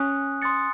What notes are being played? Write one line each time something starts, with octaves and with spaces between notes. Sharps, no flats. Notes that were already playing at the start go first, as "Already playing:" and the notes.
Already playing: C#4 G#5 D#6 F#6
C6 D#6 A6 C#7